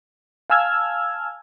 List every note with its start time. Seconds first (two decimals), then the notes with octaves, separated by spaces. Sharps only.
0.50 F5 G#5 A5 E6 F6 G#6